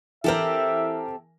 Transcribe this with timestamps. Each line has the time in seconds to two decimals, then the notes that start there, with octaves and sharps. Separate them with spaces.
0.24 E3 C4 G4 A4 A#4 E5